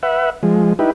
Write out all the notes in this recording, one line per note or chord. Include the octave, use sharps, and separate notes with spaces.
B4 E5 F#5
F3 G#3
D#4 E4 G4 B4